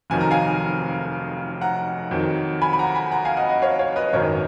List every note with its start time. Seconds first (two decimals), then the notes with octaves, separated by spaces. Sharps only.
0.10 F1 F2 D#3 F#3 G#5
0.21 A#5
0.31 F5 G#5
1.61 F#5 A#5
2.11 F2 D#3 F#3
2.62 G#5 B5
2.73 B5
2.79 F#5 A#5
2.95 G#5 B5
3.11 F#5 A#5
3.25 F5 G#5
3.37 D#5 F#5
3.49 D#5 F#5
3.62 C#5 F5
3.79 C#5 F5
3.96 B4 D#5
4.13 G#1 F#2 D#3 A#4 C#5